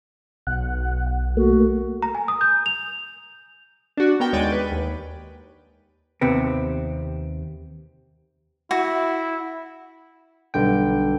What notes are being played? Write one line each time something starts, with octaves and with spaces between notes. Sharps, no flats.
B1 F#5
A3 A#3 F#4
A#5
G#5
D#6
G6
F7
D4 F#4
B3 A#4 G5
D#2 G#3 C#5 D5 G5 D#7
B4
D#2
D#2 C3 B3 C4
E4 F#4
B1 G2 D3 G5